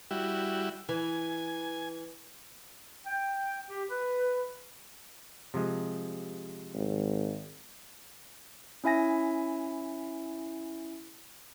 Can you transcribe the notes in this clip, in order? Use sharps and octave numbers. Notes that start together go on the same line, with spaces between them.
G3 E4 F#4
E3 G#5
G5
G4
B4
C3 F3 G#3
G#1
C#4 E4 E5 G#5 A#6